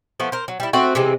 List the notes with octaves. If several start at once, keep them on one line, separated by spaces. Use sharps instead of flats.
F3 A3 B3
A#4 C5
F#3
G3 E4
A3 C4 F#4
C3 E3 G#3 C4